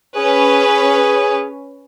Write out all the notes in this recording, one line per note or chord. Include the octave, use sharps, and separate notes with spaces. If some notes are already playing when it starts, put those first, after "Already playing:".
C#4 G#4 B4